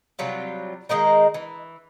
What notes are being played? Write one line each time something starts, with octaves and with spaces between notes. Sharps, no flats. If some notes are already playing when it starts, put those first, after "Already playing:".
C3 F#3 G3 F4
D#3 G#3 A#3 D#4
E3